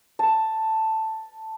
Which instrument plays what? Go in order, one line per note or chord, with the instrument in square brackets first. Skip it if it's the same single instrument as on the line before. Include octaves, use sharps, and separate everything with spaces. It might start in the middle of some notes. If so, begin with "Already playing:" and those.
[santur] A5